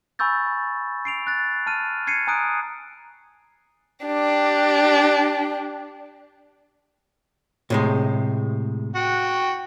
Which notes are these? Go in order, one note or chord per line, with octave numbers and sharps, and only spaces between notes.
G#5 B5 C#6 E6 G6 A6
C7 D7 F7
F#6 A6
A5 F6 D#7
G#6 C7 C#7 D#7
G#5 A#5 D#6 F#6 D7
D4 G4
A2 C3 G#3
F#4 G5